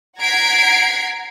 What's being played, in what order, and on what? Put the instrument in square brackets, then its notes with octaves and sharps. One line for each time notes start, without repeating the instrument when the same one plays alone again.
[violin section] F#5 A#5 G#6 B6 C7 D7